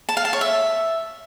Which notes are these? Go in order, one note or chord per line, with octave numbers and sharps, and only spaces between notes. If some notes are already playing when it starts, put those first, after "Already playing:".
A5
F5
A5
C#5
E5